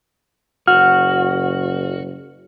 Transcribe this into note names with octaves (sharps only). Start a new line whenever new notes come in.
F#1 F#4 F6